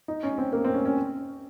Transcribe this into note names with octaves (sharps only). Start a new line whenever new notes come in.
D#4
C#4
C4
A#3
C4
C#4
C#4